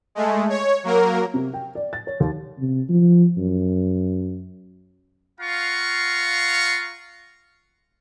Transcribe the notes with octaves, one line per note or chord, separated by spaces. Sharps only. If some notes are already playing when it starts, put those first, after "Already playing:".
G#3 A3
C#5
F#3 A#3 A#4
C3
G5
D5
A6
C#5
D#2
C3
F3
F#2
F4 F5 F#5 A#5 C#6